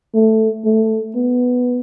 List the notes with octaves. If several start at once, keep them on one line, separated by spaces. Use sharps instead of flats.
A3
A3
B3